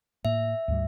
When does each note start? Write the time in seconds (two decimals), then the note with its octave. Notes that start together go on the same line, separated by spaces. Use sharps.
0.25 A2 A#3 E5
0.68 D2 G#2 G3